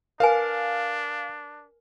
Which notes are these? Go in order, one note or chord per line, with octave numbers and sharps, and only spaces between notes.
D4 A#4 B4 F5 G#5